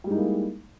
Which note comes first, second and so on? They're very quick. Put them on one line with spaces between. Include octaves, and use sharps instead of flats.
G3 G#3 D#4 E4 A#3